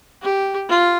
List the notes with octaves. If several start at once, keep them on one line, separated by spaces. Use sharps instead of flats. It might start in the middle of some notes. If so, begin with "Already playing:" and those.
G4
F4